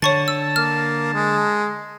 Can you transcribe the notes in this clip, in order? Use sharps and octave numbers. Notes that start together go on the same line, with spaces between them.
D3 C#5 A5 C#6 A6
E6
A#3 F6
G#3